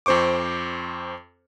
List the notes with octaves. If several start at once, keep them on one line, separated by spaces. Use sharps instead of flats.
F2 C4 C5 C#6 D6